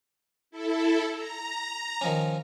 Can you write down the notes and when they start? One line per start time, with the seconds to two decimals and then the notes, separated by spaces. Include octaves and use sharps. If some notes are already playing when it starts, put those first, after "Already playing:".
0.51 E4 A4
1.13 A#5
2.01 D#3 F3 C#4